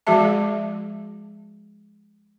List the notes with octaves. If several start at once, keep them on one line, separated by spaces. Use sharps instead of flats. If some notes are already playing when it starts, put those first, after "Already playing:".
F3 G#3 F#4 G#4 E5 A5